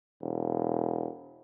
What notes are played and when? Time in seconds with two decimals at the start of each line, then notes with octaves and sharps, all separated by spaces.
0.22 E1